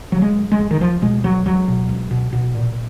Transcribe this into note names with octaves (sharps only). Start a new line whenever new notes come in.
C#3 F#3
G#3
F#1
G#3
F#1
D#3
C#2 F3
B2 G#3
C#2 F#3
C#2 F#3
B2
C#2
B2
B2
A#2